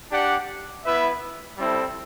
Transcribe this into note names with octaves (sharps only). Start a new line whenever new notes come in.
D4 G4 D5 F#5
B3 E4 B4 E5
G3 C4 E4 A4